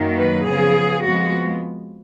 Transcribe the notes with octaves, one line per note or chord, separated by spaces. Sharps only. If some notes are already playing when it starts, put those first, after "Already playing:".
Already playing: F#2 D#3 F#3 A#3
B4
C#3 F3 B3 G#4
F2 F3 G#3 B3 F#4